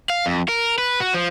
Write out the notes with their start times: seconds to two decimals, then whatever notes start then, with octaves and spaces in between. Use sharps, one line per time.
0.10 F5
0.26 F2
0.49 A#4
0.78 B4
1.00 F#4
1.14 F3